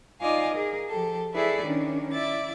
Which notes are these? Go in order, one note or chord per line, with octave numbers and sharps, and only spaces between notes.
D#4 F4 D5 D#5 F5 G#5
G#4 A#4
F3 G4 A4
E4 G#4 A4 B4 D5 E5
D#3 C#4 D4
E4 D5 E5 A6